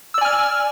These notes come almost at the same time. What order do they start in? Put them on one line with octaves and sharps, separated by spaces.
E6 D5 G#5 F6